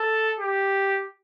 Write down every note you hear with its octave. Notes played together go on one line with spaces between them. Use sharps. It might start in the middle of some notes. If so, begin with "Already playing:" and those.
Already playing: A4
G4